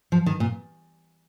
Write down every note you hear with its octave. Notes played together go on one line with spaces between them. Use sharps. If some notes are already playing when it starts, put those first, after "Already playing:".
F3
D#3
A#2